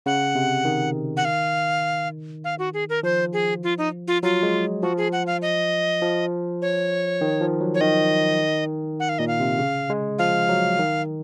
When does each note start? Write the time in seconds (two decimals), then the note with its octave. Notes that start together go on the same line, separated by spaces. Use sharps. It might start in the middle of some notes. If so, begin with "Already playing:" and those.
0.06 C#3 F#5
0.35 C3
0.65 D#3
1.17 F#5
1.25 F5
2.44 F5
2.59 F#4
2.74 G#4
2.89 A#4
3.03 F3 C5
3.33 G#4
3.63 F4
3.78 D#4
4.08 F4
4.23 F#3 F4
4.43 G#3
4.82 F3 F#4
4.98 G#4
5.12 F#5
5.27 F5
5.42 D#5
6.02 F3
6.62 C#5
7.21 D#3
7.41 F3
7.61 F#3
7.75 C#5
7.81 D#3 D#5
9.00 F#5
9.09 F5
9.19 A#2 D#5
9.28 F5
9.40 C3
9.59 C#3
9.90 G#3
10.19 F3 F5
10.49 F#3
10.79 D#3